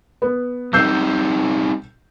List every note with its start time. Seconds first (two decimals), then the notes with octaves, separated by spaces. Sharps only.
0.22 B3
0.73 G3 C4 D#4 E6 G6 C7